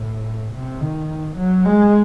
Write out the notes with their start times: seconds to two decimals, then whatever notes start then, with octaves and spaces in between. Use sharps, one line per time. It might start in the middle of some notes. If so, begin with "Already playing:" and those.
Already playing: A2
0.52 C3
0.80 D#3
1.36 F#3
1.65 G#3